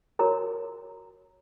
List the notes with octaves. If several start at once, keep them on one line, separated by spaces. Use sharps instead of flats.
F#4 A#4 C#5 A#5